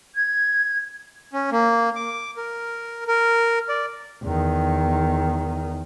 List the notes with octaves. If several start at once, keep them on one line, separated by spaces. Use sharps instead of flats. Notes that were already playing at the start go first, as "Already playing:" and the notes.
G#6
C#4
A#3
D6
A#4
A#4
D5
E2 D#3